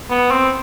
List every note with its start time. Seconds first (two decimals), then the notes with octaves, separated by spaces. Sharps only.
0.10 B3
0.31 C4